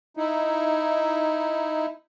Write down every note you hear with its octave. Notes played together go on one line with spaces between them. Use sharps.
D#4 E4